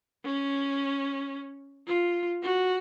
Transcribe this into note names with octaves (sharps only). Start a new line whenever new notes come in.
C#4
F4
F#4